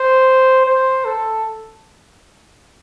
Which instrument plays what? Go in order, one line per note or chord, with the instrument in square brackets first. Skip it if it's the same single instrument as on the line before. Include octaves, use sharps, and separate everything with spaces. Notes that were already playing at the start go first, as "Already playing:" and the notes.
Already playing: [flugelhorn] C5
C5
A4